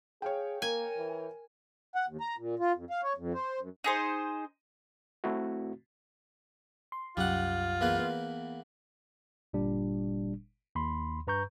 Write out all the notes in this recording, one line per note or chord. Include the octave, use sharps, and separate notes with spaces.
G#4 C#5 F5 G5
A#3 A#4 G#5
E3
F#5
D#2
A#5
A#2
F4
F2
F5
C#5
F2
C5
F#2
D#4 G#4 C5
A3 C4 E4 F#4
C6
C2 F#2 G3 F4 F#5
E2 A#3 B4
B3
G1 A#2 G3 D4
D#2 B5 C6
G2 B4 A#5 C#6 G6